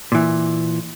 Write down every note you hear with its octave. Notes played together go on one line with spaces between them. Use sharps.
A#2 E3